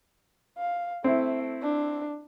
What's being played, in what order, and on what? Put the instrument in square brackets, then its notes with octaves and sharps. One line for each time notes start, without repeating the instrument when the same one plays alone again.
[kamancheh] F5
[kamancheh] A3 [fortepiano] C4 E4
[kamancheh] D4